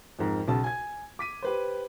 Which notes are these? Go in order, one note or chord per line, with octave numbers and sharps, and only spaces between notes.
F2 G#2 A#4
B1 C#3 A5
G#5 G#6
D6 B6 D#7
G4 B4 C5